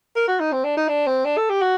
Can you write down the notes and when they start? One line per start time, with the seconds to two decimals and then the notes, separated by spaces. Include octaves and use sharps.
0.16 A#4
0.28 F#4
0.40 D#4
0.52 C4
0.64 D4
0.77 D#4
0.88 D4
1.07 C4
1.25 D4
1.37 A4
1.50 G4
1.62 F#4